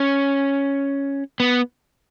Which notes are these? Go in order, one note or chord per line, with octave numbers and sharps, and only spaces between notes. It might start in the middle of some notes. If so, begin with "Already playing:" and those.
Already playing: C#4
B3